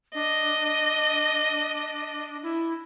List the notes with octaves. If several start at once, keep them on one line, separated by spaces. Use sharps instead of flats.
D4 D#5
E4